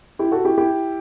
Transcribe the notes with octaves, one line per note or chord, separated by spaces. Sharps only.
E4 G4
F#4 A4
E4 G4
E4 G4